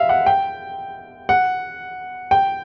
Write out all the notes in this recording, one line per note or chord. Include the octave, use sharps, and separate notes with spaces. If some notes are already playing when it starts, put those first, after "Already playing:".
Already playing: E5 F5
F#5
G5
F#5
G5